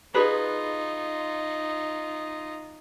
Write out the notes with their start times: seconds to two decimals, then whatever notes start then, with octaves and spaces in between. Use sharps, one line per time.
0.14 D#4 F4 G#4 B4